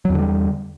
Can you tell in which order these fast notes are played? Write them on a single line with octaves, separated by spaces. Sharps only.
F#3 E2 D3 G3